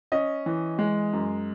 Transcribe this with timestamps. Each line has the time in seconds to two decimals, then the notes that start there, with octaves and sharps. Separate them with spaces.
0.12 C#4 D#5
0.46 E3
0.79 G#3
1.13 F#2